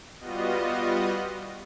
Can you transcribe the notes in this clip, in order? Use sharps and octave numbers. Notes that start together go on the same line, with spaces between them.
G3 B3 F4 F#4 D#5